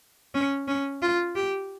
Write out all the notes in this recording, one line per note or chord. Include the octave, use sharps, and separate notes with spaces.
C#4
C#4
F4
G4